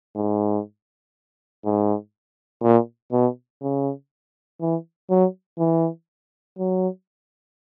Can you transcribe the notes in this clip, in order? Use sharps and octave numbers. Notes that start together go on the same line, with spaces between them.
G#2
G#2
A#2
B2
C#3
E3
F#3
E3
F#3